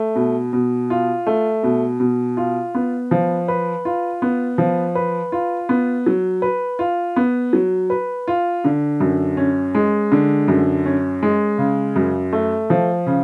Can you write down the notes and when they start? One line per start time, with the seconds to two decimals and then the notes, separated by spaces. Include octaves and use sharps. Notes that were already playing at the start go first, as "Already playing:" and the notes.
Already playing: A3
0.15 B2
0.53 B2
0.90 F4
1.27 A3
1.63 B2
2.00 B2
2.37 F4
2.75 B3
3.11 F3
3.48 B4
3.85 F4
4.22 B3
4.58 F3
4.95 B4
5.32 F4
5.69 B3
6.06 F#3
6.42 B4
6.79 F4
7.16 B3
7.53 F#3
7.90 B4
8.28 F4
8.64 D3
9.00 F#2
9.37 C#4
9.75 G#3
10.12 D3
10.48 F#2
10.86 C#4
11.23 G#3
11.58 C#3
11.96 F#2
12.33 A3
12.70 F3
13.06 C#3